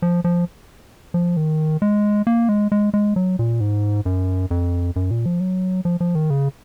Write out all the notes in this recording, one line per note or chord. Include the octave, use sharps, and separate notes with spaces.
F3
F3
F3
D#3
G#3
A#3
G#3
G#3
G#3
F#3
A#2
G#2
F#2
F2
F#2
A#2
F3
F#3
F3
F3
D#3
C#3